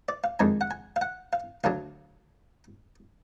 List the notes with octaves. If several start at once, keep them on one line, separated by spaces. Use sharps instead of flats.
D5
F5
F2 D#3 G#3 D4 G#5
F#5
G#5
F5
F#5
F5
D2 D3 F#3 D4 F5